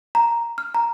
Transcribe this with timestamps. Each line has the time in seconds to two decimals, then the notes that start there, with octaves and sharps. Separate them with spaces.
0.15 A#5
0.58 F6
0.75 A#5